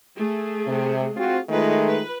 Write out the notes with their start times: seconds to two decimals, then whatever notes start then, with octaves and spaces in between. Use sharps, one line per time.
0.17 A3 G#4
0.66 C3
1.16 C4 F4 F#4
1.49 D#3 G#3 A3 F4 B4
1.88 B4